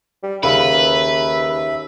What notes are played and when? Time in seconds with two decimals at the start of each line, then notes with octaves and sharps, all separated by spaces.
0.23 G3
0.43 D#2 C#3 B4 E5 F5 B5